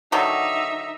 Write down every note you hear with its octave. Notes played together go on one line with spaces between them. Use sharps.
D3 D#3 F#3 D#4 E5